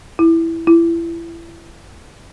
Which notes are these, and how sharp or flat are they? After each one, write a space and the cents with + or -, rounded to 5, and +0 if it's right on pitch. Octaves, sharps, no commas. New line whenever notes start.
E4 +0
E4 +30